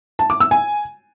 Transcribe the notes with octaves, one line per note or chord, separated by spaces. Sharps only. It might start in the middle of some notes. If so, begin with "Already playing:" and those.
A5
D6
E6
G#5